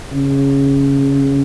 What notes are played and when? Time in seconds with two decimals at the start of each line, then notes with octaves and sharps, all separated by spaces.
0.11 C#3